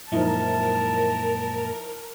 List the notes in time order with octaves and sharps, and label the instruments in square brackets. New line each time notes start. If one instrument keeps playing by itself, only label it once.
[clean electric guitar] F#2 A#2 G#3 [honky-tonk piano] F3 D#4 E4 [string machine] A#4 [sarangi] A5